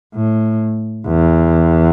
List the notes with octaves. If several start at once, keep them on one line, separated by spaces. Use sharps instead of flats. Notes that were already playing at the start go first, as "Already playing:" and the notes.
A2
E2